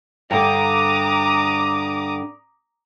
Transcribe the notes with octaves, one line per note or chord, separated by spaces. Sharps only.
G2 D3 A#5 D6 D#6